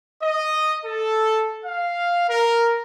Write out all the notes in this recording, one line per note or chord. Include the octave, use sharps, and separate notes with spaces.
D#5
A4
F5
A#4